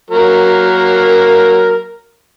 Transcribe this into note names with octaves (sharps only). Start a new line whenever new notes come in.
F#3 A#3 A#4